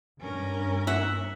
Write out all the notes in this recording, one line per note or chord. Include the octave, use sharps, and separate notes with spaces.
G2 C#4 A#4
E5 F#5